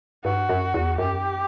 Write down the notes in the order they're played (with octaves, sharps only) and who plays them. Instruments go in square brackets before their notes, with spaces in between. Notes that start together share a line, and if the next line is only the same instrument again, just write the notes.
[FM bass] G2 [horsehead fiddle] F#4
[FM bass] F#2
E2
[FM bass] F#2 [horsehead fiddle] G4